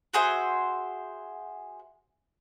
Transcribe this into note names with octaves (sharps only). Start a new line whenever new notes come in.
F#4 G#4 C5 E5